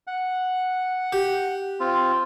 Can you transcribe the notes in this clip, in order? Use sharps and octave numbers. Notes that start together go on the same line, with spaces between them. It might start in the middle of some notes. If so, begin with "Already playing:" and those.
F#5
G4
C4 F4